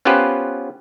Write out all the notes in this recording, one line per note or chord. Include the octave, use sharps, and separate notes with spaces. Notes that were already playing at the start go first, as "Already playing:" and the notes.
B3 C#4 F4 G4 B4 C5